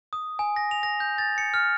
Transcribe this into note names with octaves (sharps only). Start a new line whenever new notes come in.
D#6
G#5
A#6
F7
A#6
G6
A6
C#7
F6